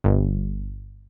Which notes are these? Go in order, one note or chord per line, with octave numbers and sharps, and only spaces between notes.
G1